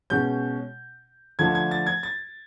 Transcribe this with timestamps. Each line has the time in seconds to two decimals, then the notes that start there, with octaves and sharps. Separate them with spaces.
0.10 B2 G#3 C#4 G6
1.39 D3 F3 A3 D4 G#6
1.55 G#6
1.71 A6
1.87 G#6
2.03 A6